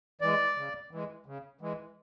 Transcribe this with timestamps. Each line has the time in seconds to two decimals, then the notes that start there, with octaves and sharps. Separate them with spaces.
0.21 E3 G#3 D5
0.56 C#3
0.91 E3 G#3
1.26 C#3
1.61 E3 G#3